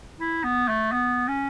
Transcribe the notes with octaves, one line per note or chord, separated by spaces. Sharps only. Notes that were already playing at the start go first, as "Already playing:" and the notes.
E4
B3
A3
B3
C#4